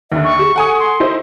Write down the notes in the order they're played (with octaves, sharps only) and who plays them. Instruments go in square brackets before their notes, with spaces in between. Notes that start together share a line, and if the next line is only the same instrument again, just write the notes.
[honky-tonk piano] D#2 D3 [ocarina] E5
[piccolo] C#6
[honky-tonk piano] G4 [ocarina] G#4
[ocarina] A4 [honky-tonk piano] F#5 G#5 D#6
[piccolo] C6
[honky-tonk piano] D#4 E4 C5